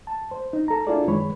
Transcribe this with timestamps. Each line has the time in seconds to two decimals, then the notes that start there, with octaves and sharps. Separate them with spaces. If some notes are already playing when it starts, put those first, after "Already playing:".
0.07 A5
0.31 C5
0.53 D#4
0.68 A4 A#5
0.87 D4 E4 F4 G#4 A4 D5
1.06 F#2 D#3 G#3 B4 C#5 B5